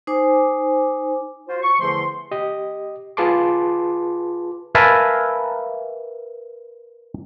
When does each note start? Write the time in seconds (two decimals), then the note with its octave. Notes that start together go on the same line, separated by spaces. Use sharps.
0.07 D#4 C5 G#5 D6
1.48 F4 F#4 C5
1.62 C#6
1.80 E2 D3 F3 A3 C5 C6
2.31 G4 D#5
3.17 F4 G#4 B4 A5 C6 D6
4.75 A#4 B4 E5 F5 G#5 A5